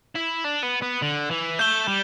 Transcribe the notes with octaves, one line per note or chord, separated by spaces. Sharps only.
E4
D4
B3
B3
D3
E3
A3 G6 E7 G7
G3